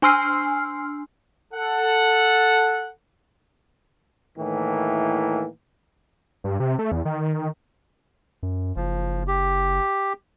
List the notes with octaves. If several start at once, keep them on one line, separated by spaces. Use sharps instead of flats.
D4 G#5 C6 E6 F6 C7
A4 F#5
A2 D#3 E3 A#3
G2
C3
A3
E2
D#3
F#2
F#1 F3
G4